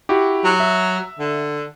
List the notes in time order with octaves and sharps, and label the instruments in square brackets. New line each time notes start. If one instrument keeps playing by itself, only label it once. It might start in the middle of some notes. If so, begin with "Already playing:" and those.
[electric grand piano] E4 F#4 G4
[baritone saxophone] F#3
[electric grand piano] E5
[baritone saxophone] D3